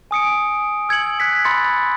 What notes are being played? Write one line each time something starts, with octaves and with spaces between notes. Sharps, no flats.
G#5 D#6 C#7 D7
E6 G#6 C#7 F#7
F#6 G#6 B6 C#7
B5 C6 A6 C#7